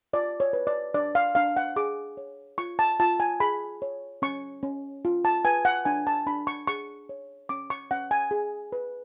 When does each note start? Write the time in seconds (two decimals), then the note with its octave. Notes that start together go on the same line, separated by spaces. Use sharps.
0.13 F4 D5
0.40 C#5
0.53 B4
0.67 D5
0.94 D4 D5
1.15 F5
1.35 D4 F5
1.57 F#5
1.76 G#4 D6
2.17 C#5
2.58 F4 C#6
2.79 A5
3.00 F4 A5
3.20 G#5
3.40 G#4 B5
3.82 C#5
4.22 C#4 C#6
4.63 C#4
5.05 F4
5.25 A5
5.45 B4 G#5
5.65 F#5
5.85 D4 G#5
6.07 A5
6.26 D4 B5
6.47 C#6
6.68 G#4 C#6
7.09 C#5
7.49 C#4 D6
7.70 C#6
7.91 C#4 F#5
8.11 G#5
8.31 G#4
8.72 B4